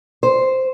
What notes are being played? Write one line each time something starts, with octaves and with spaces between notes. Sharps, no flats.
C5